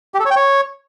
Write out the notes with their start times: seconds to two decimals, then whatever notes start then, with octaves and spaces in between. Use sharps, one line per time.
0.14 G4
0.20 A4
0.25 C#5
0.31 G5
0.36 C#5